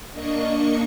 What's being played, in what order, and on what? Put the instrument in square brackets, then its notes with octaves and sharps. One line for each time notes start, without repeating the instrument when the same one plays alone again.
[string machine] A#3 D4 D#5 C#6 C#7